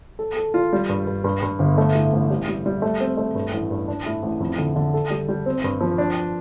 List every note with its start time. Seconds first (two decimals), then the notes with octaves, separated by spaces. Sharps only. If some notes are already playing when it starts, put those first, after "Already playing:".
0.19 A4
0.36 A4
0.54 F4
0.73 G3
0.89 G2
1.07 G2
1.24 G2
1.42 G2
1.59 G1
1.78 A3
1.95 A2
2.13 A1
2.30 G3
2.48 G3
2.66 G3
2.82 A3
3.00 C4
3.17 A3
3.35 G2
3.53 A1
3.71 G2
3.88 D4
4.06 A2
4.22 A1
4.40 F2
4.58 D3
4.76 D3
4.94 A4
5.10 G3
5.28 G3
5.46 C4
5.64 G2
5.81 F3
5.98 D4